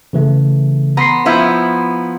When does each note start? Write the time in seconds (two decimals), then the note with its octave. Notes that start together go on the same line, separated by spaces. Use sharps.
0.13 C#3 E3 A3
0.97 B3 A#5 C6 C7
1.26 F3 B3 E4